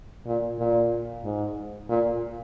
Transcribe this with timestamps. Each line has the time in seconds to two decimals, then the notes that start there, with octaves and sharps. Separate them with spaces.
0.26 A#2
0.59 A#2
1.24 G#2
1.89 A#2